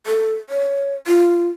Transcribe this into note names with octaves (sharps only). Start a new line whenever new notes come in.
A4
C#5
F4